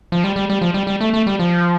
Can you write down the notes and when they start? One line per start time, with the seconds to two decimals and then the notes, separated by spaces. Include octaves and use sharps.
0.12 F3
0.24 G3
0.36 G3
0.50 G3
0.62 F3
0.74 G3
0.87 G3
1.01 A3
1.13 A3
1.27 G3
1.39 F3